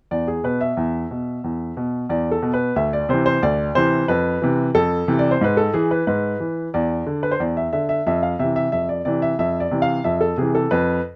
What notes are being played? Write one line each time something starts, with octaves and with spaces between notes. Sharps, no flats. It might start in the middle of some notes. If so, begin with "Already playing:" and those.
E2 D5
G#4
B2 B4
E5
E2
B2
E2
B2
E2 D5
A4
B2
B4
D2 E5
D5
C3 E3 C5
C5
D2 D5
C3 E3 C5
F2 B4
C3 E3
F2 A4
C3 E3
D5
C5
G#2 B4
A4
E3 G#4
B4
G#2 B4
E3
E2 D5
D3
B4
C5
E2 D5
E5
D3 E5
E5
F2 E5
F5
C3 E3 E5
E5
F2 E5
D5
C3 E3 D5
E5
F2 E5
D5
C3 E3
F5
F2 E5
A4
C3 E3 G#4
A4
F2 B4